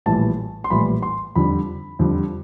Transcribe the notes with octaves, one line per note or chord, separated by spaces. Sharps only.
A#1 A2 E3 G3 A5
C6
A#1 A2 E3 G3 B5
C6
F2 D3 G3 B5
F2 D3 G3